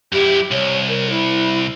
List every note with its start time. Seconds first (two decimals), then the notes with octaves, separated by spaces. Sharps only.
0.13 F#2 E4 G4
0.51 C2 C#5
0.88 A#4
1.10 E4